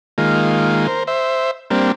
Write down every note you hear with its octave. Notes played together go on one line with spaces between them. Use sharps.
D#3 G#3 A#3 F4
A#4 C5
C5 E5
G3 A#3 C4 D4